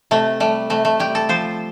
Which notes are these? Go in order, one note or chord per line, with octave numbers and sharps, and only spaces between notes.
C3 A3
G3 A3
C3 A3
A3
G3 G4
A4
F3 C5